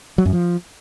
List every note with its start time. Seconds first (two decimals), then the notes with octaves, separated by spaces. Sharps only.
0.18 F#3
0.26 F#2
0.33 F3